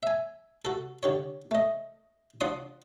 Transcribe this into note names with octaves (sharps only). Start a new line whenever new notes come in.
E5 G#5
F#4 A4
D3 G4 C#5
A3 D#5
F3 D4 D5 F#5 C6 D#6